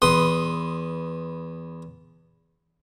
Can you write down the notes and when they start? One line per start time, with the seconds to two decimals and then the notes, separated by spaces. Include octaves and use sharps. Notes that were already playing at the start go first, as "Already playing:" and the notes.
0.02 E2 B4 C6 D#6